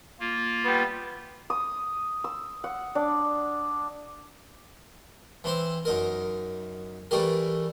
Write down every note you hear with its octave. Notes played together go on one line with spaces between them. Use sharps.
A#3 F4
G3 B3
D#6
E6
F#5
D4
E3 C4 C5
F#2 D#4 A#4
E3 G3 A3 G4 A#4